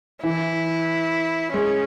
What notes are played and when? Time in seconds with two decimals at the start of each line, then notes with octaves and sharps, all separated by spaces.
0.23 E3 E4
1.53 G#3 C#4